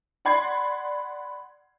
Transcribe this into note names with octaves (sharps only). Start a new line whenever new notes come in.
D5 F#5 B5 C6 G#6 C7